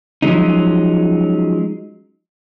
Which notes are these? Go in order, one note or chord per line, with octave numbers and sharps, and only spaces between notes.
F3 F#3 G#3 C#4 D#4